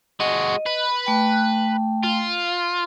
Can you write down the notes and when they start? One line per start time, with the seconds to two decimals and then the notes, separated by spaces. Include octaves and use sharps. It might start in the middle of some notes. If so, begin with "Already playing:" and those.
0.20 G#3 F#4 D#5
0.66 B4
1.06 A3 G5
2.04 F4